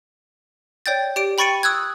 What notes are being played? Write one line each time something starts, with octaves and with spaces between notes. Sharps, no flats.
C#5 D5 G5 G6 A6
G4 D5 D7
G5 B5 C#6 A6 C#7 D#7
D#6 E6 F#6 G#6